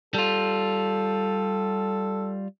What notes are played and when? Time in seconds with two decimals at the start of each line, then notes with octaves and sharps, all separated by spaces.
0.14 G3 F4 A4